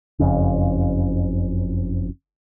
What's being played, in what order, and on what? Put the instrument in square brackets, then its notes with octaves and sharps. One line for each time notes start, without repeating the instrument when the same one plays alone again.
[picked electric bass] F#1 F2 C#3